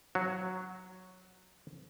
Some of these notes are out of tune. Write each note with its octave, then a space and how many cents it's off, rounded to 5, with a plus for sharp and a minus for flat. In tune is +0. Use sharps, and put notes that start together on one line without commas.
F#3 +0 F#4 +0